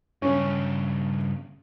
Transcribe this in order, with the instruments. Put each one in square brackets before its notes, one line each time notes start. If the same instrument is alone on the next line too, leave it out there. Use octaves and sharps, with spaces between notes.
[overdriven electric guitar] G2 C#3 [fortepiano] C#4